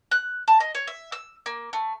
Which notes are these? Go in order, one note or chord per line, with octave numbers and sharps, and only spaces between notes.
F#6
A5
D#5
C#5
E5
E6
A#3
A3